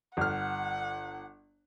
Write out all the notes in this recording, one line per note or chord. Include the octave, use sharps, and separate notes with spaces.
G1 F#5 F6